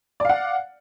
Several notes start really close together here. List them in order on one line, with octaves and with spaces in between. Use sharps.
D5 F5 F#5